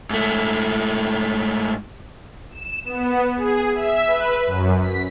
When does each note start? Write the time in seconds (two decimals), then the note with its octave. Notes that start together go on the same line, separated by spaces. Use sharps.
0.10 G#2 A3
2.50 E7
2.84 B3
3.36 G#4
3.74 E5
4.07 B4
4.46 F#2
4.79 B6